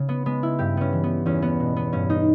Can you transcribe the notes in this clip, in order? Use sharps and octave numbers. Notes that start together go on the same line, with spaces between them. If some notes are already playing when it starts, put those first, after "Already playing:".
Already playing: C#3
B3
G#3 B3
E4
G2 G4
B3 C#4
E3
B3
E2 C#4
B3
B2
B3
G2 C#4
D#4